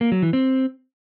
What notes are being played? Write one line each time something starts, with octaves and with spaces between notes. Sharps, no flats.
A#3
F#3
E3
C4